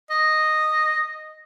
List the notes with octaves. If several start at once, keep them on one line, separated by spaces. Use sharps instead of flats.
D#5